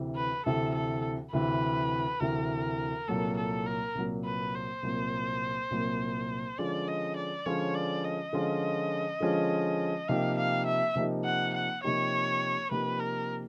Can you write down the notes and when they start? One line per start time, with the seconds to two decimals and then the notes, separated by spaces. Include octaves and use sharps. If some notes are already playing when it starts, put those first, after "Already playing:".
Already playing: D2 C3 E3
0.16 B4
0.46 D2 C3 E3 A4
0.75 A4
1.33 D2 C3 E3 B4
2.20 D2 C3 E3 A#4
3.08 C2 A#2 F#3 A#3 A4
3.37 A4
3.67 A#4
3.95 C2 A#2 F#3 A#3
4.25 B4
4.55 C5
4.83 C2 A#2 F#3 A#3
5.71 C2 A#2 F#3 A#3
6.58 D3 F3 G#3 C#4 F4 D5
6.88 D#5
7.16 D5
7.46 D3 F3 G#3 C#4 F4 C#5
7.75 D5
8.04 D#5
8.33 D3 F3 G#3 C#4 F4
9.20 D3 F3 G#3 C#4 F4
10.08 C3 F3 A#3 D#4 G4 F5
10.38 F5
10.66 E5
10.95 C3 F3 A#3 D#4 G4
11.25 F#5
11.54 F#5
11.84 C3 F3 A#3 D#4 G4 C#5
12.71 C3 F3 A#3 D#4 G4 B4
13.00 A#4